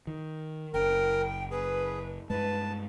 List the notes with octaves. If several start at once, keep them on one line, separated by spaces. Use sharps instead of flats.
D#3
F#1 A#4 G5
G#4 B4
G2 G#3 B4 A5